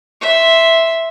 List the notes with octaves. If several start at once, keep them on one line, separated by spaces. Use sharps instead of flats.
E5 C6